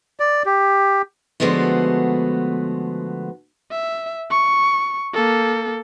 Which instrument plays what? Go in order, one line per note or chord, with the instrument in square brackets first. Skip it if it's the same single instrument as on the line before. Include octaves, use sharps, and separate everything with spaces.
[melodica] D5
G4
[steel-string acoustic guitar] D3 F3 G#3 A3 B3 F#4
[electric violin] E5
C#6
A#3 A4